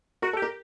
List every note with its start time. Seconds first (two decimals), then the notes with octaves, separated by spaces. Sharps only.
0.22 F#4 A#4
0.33 A4
0.37 G4
0.42 A#4